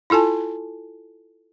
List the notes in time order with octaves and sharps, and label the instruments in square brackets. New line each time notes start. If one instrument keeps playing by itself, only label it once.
[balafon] E4 F4 A4 G#5 A5